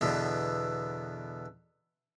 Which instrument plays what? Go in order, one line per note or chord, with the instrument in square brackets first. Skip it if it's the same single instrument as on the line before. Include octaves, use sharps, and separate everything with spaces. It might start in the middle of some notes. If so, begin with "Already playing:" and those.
[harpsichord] E2 B2 D3